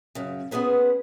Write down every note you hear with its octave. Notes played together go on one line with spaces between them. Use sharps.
F#2 C#3
B3 C#4 G#4 B4 C5